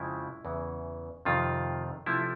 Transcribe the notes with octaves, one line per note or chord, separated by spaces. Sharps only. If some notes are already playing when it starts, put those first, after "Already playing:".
Already playing: F2 C#3 F3 G#3 E4
E2 C#3 E3
F2 C3 D#3 F4
C3 F3 A3 E4